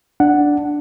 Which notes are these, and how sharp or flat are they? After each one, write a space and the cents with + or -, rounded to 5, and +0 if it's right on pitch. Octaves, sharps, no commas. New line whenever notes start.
D4 +0 F#5 +0